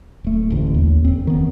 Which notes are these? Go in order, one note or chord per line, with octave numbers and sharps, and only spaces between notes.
D1 A3
A1 D2
D#2
F1 C4
D#3 B3